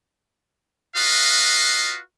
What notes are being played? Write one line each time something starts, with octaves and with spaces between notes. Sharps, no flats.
F4 F#4 B4 D#5 F5